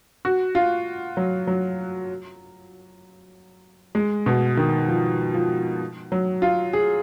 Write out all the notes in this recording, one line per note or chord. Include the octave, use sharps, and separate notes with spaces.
F#4
F4
F#3
F#3
G#3
B2
D#3
F3
F3
F#3
F4
G#4